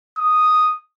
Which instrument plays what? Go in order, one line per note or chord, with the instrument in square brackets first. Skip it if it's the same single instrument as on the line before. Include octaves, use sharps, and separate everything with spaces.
[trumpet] D#6